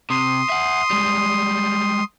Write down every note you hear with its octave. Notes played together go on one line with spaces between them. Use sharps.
C3 C6 D#6
E5 F#5
G3 G#3